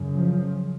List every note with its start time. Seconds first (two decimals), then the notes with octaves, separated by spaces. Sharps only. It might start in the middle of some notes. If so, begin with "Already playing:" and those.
Already playing: F#2 C#3
0.15 F3